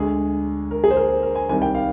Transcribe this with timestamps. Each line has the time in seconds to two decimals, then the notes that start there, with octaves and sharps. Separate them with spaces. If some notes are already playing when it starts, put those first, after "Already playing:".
Already playing: D2 D3 G#3 G#4
0.71 A#4
0.84 G#4
0.91 C5
0.97 A#4
1.23 A#4
1.35 G#5
1.49 C2 C3 D#3 G3 G#5
1.62 G5
1.74 F5